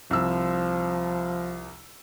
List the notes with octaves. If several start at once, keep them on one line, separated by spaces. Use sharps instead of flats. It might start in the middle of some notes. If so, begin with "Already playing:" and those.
C2 F3 E6